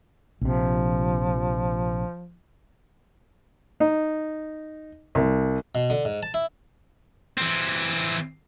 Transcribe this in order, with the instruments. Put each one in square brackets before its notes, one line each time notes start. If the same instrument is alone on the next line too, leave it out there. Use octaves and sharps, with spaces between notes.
[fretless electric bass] A#1 C3 [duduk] F3
[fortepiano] D#4
C2
[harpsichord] B2
D3
G#2
A5
E4
[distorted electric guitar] E3 C4